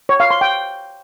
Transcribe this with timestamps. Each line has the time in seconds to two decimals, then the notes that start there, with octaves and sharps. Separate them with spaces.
0.09 C#5
0.20 F5
0.31 C6
0.41 G5